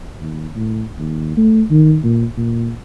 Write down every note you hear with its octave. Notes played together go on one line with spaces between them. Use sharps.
D#2
A2
D#2
A3
D#3
A#2
A#2